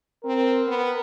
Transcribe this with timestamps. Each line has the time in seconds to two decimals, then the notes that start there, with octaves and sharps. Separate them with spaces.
0.25 C4 A#4
0.67 B3